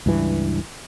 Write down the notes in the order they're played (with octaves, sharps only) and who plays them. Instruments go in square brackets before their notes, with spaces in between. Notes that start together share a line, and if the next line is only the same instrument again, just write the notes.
[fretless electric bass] C#2 G2 E3